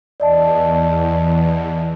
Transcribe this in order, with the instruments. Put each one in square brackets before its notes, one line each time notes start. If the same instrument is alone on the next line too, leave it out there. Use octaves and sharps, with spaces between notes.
[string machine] E2 [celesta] D5 D#5 A5